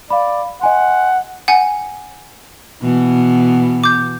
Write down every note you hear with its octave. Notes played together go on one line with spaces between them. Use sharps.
D5 F5 B5
D#5 F#5 G#5 C6
F#5 G#5
B2 E3 B3
D6 G6